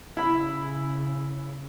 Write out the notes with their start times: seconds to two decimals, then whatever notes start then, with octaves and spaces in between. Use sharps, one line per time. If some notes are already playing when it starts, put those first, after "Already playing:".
0.17 C#3 E4 B5